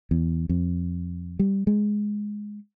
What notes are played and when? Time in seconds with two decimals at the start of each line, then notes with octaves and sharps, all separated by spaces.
0.11 E2
0.49 F2
1.39 G3
1.67 G#3